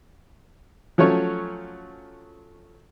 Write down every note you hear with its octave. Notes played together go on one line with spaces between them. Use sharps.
F3 F#3 A3 C#4 C#5